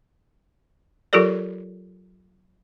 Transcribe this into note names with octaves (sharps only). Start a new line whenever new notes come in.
F#3 F4 G4 A4 A#4 D5